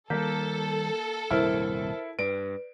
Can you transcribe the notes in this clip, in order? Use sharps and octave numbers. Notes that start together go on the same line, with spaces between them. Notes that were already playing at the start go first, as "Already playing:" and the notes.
D#3 G3 A#3 A4 G6 B6
D#1 C2 G2 E4 A#4 C5 F6
G2 B4 D5 D7